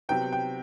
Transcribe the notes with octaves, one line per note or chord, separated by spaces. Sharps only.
C3 F#3 B3 G5
G5